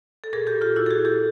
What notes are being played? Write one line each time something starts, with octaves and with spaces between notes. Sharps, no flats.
A4
A#2 G#4 A#4
G4 A4
A#2
F4 G4
A#2 E4 F#4
A4
F#4 G#4
A#2
G4 A4